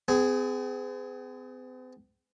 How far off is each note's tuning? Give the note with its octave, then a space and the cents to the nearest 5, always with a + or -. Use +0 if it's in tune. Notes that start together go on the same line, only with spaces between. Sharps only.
C4 -45 G#4 +0